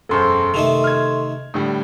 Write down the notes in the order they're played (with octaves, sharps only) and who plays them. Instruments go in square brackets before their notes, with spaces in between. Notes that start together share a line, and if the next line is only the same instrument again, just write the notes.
[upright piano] E1 F#2 C5 [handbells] A4 C6 C#6
[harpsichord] C3 D#3 A3 [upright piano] F7
[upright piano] F6 G#6
A2 D3 G3